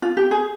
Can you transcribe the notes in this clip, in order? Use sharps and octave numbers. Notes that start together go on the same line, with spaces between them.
F4
G4
G#4